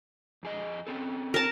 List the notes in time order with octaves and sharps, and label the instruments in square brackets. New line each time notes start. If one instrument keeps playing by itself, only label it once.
[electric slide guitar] F2 G#4 D#5
C4 C#4 A4
[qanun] A#4 A5